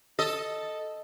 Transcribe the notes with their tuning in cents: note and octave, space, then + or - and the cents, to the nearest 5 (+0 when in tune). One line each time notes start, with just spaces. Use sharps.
A4 +0 D#5 +0